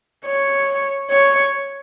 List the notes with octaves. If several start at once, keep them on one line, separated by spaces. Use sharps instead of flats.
C#5
C#5